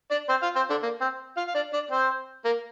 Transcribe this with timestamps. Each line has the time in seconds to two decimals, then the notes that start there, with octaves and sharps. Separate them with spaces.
0.11 D4 D5
0.29 C4 C5
0.42 F4 F5
0.56 C4 C5
0.70 D3 D4
0.83 A#3
1.01 C4
1.37 F4 F5
1.47 F5
1.55 D4 D5
1.73 D4 D5
1.91 C4 C5
2.45 A#3 A#4